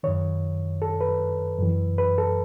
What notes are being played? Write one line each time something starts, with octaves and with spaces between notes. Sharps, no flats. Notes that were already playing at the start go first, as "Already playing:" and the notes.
F#2 D#3 C#5
A4
B4
F#2 E3
B4
A4